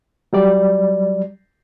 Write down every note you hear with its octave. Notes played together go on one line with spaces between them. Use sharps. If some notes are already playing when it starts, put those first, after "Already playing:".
F#3 G3 D5